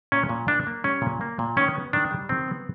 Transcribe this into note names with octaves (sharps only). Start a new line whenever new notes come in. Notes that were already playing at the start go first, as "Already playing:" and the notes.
A#2 C#4
A#2
A#3 D4
A#3
G3 C#4
A#2
A#3
A#2
D#3 C#4
B3
D#3 D4
G3
D#3 C4
B3